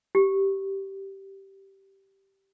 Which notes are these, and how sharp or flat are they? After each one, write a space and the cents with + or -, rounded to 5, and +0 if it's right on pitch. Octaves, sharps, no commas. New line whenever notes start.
G4 -10